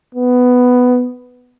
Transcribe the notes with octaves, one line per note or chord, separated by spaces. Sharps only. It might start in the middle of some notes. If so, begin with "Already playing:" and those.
B3